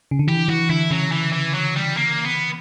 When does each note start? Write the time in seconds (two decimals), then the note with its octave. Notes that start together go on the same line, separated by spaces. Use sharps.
0.11 C#3
0.19 D3
0.27 E3 G4
0.48 E3 F#4
0.69 D3 E4
0.91 C#3 F#3
1.12 E3
1.33 E3
1.54 F#3
1.76 G3
1.97 A#3
2.25 B3